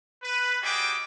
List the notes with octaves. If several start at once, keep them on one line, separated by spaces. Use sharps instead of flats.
B4
G3 F#4 G#4 D#5 G5 D6